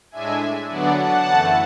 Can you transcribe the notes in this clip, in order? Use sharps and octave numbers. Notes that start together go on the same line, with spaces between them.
A2 G#3 D4 E5 G#5
D3 F#3 B3 D4 D5 F#5
F#5 A5
F#2 E3 A3